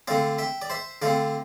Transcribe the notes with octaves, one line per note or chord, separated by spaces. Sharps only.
D3 A3 C4 D5 F5
E5 G5
D5
C5 E5
D3 A3 C4 D5 F5